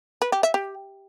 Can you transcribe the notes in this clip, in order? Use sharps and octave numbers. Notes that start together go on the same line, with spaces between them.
B4
G4
E5
G4